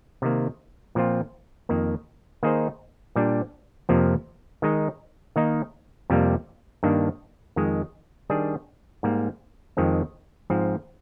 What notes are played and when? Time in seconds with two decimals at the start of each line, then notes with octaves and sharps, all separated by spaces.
0.22 C3 D#3 A#3
0.95 A#2 F3 C4 F4
1.69 F2 D#3 A#3
2.43 D#3 A#3 D#4 G#4 C5
3.16 A#2 G3 D4
3.89 F2 C3 F3 A#3
4.62 D#3 G#3 D#4
5.36 D#3 A#3 D#4
6.10 F2 C3 G3 A#3
6.83 G2 D#3 A#3 D4
7.56 F2 D#3 G#3
8.30 D#3 G3 D4 G#4
9.03 G#2 G3 A#3
9.77 F2 D#3 G#3 C4
10.50 G#2 F3 C4